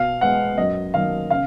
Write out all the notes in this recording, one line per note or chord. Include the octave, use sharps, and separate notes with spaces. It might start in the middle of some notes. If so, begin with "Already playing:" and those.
Already playing: B2 F5
G#3 B3 F#5
F#2 D#5
D#3 F#3 A#3 F5
C#3 F5